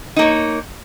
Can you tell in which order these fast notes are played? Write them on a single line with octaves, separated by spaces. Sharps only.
D#4 A#3 C#5